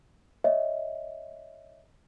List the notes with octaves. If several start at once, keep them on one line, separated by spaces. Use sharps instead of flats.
C#5 D#5 E5